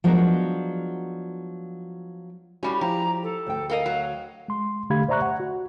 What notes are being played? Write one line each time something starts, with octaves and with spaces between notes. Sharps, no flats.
F3 F#3 G#3 B3 D4 A#4
A2 G3 C#4 F#4
F3 E4 G4 A#5
A4
D2 G5
A4 A#4 D#5 F5
F#3
G#3 C6
D3 A3 G4 F5 B5 G#6
C5 D5 E5 A#5 C#6 F#6
F#5
F#4